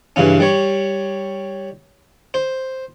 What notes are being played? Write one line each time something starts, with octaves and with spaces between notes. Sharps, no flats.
G2 C#3 E3 C#4
G3 C#5
C5